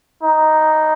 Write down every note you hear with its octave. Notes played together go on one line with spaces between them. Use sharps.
D#4